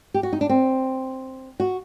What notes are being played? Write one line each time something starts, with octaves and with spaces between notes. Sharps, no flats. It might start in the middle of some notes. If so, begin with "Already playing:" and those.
G4
F#4
D#4
D4
C4
F#4